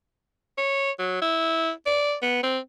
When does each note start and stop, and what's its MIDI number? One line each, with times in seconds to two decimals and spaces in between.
0.58 0.91 73
0.99 1.20 54
1.22 1.71 64
1.86 2.15 74
2.22 2.41 59
2.43 2.59 60